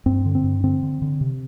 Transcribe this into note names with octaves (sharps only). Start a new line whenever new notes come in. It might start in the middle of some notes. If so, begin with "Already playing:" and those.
G2 C4
D3
C4
G2
D3 C4
D3
D3
C3